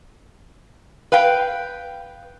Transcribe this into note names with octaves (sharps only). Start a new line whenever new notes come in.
B4 F5 G5